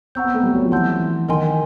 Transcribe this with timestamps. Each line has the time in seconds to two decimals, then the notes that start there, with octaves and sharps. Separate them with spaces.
0.15 C4 F#5 A#5 C#6 E6 G6
0.24 B3
0.34 A3
0.43 G3
0.54 F#3
0.63 F3
0.72 E3 F#5 A5 C6 E6 G6
1.29 D#3 A#4 D#5 G#5 C6